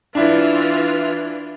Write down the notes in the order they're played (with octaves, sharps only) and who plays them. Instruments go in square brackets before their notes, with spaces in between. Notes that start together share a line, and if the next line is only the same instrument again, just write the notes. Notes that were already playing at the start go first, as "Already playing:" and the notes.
[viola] E3 F4 [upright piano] D4 E4